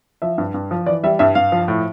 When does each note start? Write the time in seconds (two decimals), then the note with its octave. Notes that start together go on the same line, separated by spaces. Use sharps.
0.22 F3 E5
0.38 G2
0.54 G2
0.71 F3
0.86 E3 D5
1.04 G3 E5
1.19 G2 E5
1.35 G2 F5
1.52 F3
1.68 A2